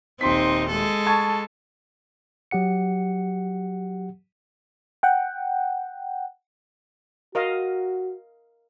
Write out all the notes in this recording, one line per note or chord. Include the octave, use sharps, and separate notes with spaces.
D#1 C4 D#4 C6 B6
G#3 A4
A5 C#6 G#6
F#3 G4 F#5 C#7
F#5 G5
F#4 A#4 D#5 F5